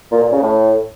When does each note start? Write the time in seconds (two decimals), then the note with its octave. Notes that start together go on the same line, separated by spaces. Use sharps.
0.11 A#2
0.21 A#2
0.31 C#3
0.41 A2